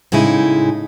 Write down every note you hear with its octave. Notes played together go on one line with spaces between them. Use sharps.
A2 C#3 G#3 D#4 E4